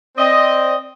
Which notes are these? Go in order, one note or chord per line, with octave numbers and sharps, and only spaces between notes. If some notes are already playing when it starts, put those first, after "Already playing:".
C4 D5 D#5